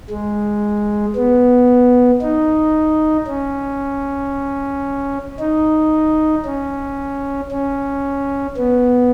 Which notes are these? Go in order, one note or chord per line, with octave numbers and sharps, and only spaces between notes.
G#3
B3
D#4
C#4
D#4
C#4
C#4
B3